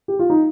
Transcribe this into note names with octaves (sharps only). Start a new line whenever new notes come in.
G4
F4
D#4